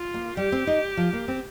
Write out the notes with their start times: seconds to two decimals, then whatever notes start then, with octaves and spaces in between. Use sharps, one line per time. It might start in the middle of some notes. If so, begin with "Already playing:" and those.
Already playing: F4
0.14 A#3
0.37 G3 G4
0.52 C4
0.67 D#4
0.97 F3
1.13 A#3
1.28 C4